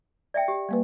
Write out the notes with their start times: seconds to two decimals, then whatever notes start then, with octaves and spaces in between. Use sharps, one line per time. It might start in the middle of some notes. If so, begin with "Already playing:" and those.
0.34 D5 E5 G5
0.48 G4
0.69 G3 A#3 B4